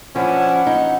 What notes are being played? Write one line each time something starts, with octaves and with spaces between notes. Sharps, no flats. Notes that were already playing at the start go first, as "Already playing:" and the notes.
F3 C#4 D4 E4 F#5
D#4